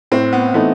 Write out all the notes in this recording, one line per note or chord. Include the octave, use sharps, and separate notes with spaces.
A2 C4
B3
E3 A3 B3 C4 D#4